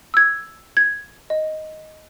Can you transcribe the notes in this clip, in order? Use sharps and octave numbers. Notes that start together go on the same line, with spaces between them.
E6 G#6
G#6
D#5